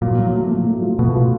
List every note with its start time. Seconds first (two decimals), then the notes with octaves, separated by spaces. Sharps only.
0.02 A#2 F#3
0.19 F#3
0.34 A3
0.51 F#3
0.66 A3
0.82 F4
0.98 B2 A3
1.15 F4